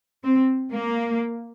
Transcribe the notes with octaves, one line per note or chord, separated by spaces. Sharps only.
C4
A#3